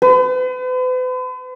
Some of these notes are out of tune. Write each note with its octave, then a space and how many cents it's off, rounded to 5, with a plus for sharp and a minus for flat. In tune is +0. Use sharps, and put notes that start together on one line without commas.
B4 +45